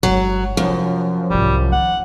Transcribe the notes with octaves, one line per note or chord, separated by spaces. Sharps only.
G1 F#3 G#3
F#2 C3 F3
C2 G#2 G3
D#3 F#5